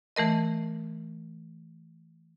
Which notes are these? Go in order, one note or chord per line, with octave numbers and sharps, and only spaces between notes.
E3 A3 A#4 D#5